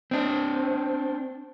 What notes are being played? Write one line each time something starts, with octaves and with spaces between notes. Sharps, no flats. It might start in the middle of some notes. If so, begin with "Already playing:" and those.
C4 D4